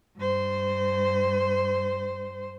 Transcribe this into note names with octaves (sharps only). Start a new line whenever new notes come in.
G2 C5